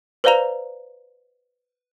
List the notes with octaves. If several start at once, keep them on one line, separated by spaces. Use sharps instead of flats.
B4 C5 D5 F5 A#5 F7